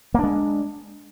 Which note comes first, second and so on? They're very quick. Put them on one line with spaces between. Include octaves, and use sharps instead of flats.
A#3 D4 G#3